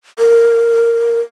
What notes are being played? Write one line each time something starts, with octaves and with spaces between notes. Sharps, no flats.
A#4